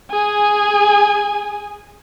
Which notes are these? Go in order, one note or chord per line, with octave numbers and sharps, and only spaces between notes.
G#4 G#5